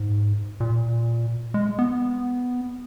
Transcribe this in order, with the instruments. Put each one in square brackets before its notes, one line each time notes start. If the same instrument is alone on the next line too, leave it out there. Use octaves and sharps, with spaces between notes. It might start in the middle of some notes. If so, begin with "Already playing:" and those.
Already playing: [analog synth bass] G#2
A#2
G#3
B3